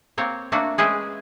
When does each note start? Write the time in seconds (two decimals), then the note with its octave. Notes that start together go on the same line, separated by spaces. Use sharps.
0.17 A#3 C4 C#5
0.52 A3 A#3 D4 F#4
0.78 G#3 C#4 G#4 B4 E5 G5